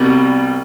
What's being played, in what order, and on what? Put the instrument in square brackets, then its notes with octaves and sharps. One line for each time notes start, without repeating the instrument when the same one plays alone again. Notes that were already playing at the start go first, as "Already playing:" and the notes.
Already playing: [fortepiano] C2 B2 G3